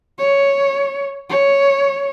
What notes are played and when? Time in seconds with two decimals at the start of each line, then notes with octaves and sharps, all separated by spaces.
0.19 C#5
1.29 C#5